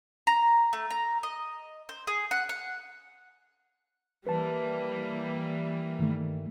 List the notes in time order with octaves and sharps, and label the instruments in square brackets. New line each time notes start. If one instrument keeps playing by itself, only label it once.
[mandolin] A#5
A3
A#5
D#5
C5
G#4
F#5
F#5
[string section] E3 G3 A#3 [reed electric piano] B4 A5
[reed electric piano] G2 D#3 A3